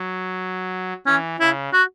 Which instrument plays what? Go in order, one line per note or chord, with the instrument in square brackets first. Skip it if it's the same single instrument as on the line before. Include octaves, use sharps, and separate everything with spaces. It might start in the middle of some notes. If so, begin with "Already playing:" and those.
Already playing: [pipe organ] F#3
[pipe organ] E3 [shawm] C#4
[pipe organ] C#3 [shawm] E4
[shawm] F#4